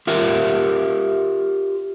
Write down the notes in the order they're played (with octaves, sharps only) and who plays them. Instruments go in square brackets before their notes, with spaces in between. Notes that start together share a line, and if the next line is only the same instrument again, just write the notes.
[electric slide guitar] F4 G4 A#4 E5